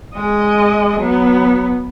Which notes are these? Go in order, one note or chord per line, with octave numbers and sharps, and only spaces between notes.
G#3 D#5
F#3 B3